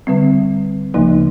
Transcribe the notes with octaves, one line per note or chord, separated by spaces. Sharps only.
D3 G3 C4
D2 C#3 F3 A#3 D#4